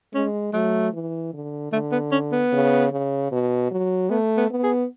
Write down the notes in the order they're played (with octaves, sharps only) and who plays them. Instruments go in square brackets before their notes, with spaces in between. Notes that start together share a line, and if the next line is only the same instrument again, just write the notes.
[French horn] G#3 [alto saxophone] C#4
[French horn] F#3 [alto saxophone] A3
[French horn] E3
D3
[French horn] D3 [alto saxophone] A3
[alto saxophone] B3
C#4
B3
[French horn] C#3
C#3
B2
F#3
[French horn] A3 [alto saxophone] B3
[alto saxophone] B3
[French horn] B3
[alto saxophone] G#4